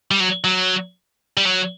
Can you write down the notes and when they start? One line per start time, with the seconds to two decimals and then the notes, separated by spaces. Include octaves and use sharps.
0.11 G3
0.20 F#3
0.44 F#3
1.37 G3
1.46 F#3